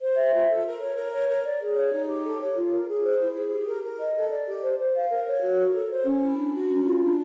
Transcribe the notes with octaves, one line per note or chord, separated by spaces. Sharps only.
C5
E5
F4
A4
A#4
C#5
A#4
C#5
A#4
D5
G#4
C#5
D#4
G4
A4
C#5
F4
A#4
G#4
C5
E4
G#4
G4
A#4
A#4
D#5
A4
D5
G4
C5
C5
F5
A#4
C#5
F#4
A#4
A4
C5
C#4
E4
D4
F#4
C#4
F4
D4